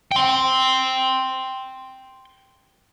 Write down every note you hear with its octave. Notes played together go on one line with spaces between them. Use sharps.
G5 C6